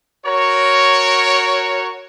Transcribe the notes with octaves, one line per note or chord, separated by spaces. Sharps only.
F#4 A#4 C#5